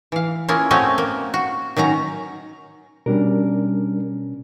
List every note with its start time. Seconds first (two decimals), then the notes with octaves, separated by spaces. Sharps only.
0.12 E3 F5
0.48 A#3 C#4 E4 F4 G#4
0.71 A3 C4 C#4 F#4 C#5 D#5
0.98 A#3
1.34 F#4
1.77 D#3 F#3 C#4 A#5
3.06 B2 G3 C#4 D4 A#4